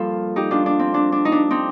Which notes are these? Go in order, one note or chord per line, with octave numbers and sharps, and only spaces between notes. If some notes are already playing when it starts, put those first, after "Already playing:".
Already playing: G2 F3 A#3 F4 A4
D#4 G4
D4 F4
D4
C4
D4
D4
D#4
D4
C4 D#4